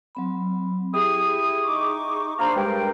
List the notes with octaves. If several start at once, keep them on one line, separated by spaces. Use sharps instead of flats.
F#3 C4 B5
E4 G4 G#4 D#6
D#4 C#6 D6
A#3 D4 C5 F5 A#5 B5
G2 G#3 A#4 G5